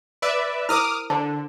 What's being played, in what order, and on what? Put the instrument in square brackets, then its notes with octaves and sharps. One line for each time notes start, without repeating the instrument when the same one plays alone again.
[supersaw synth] B4 D5 E5
[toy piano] E4 A#4 C5 [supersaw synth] D6 D#6 F6
[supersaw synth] D3 [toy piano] C5 A5